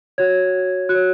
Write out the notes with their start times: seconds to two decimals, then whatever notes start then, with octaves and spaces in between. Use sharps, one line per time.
0.18 F#4 C#5 G#6
0.89 F#4 F#6
0.95 C#5